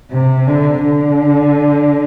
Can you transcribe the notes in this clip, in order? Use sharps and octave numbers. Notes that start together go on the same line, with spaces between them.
C3
D3
D3